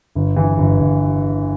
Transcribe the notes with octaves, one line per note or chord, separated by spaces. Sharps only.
G1
E3
G1
G1